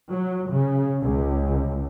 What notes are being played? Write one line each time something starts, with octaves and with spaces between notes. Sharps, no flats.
F#3
C#3
C#2